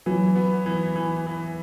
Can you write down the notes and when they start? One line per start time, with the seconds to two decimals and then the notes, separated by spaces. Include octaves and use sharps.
0.06 E3 F#3
0.36 B3
0.66 E3
0.96 E3
1.27 E3